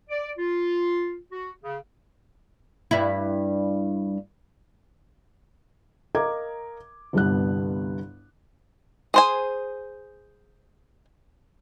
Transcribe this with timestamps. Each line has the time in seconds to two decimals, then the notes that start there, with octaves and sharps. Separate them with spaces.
0.10 D5
0.38 F4
1.31 F#4
1.64 C#3
2.91 G2 E4
6.15 A#4 D#5 F5 A#5 D6 G#6
7.13 G1 C2 G2 G3 B3 F#6
9.14 G#4 C5 G#5